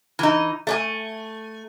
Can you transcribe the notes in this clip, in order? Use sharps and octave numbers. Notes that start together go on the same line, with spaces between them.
E3 D#4
A3 D5 G#5